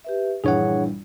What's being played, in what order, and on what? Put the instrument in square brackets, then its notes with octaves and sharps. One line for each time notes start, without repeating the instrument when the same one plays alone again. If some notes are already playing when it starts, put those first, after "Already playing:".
[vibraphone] G4 B4 E5
[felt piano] A#1 G2 E3 [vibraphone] G3 [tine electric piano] G#4 C#5 F#5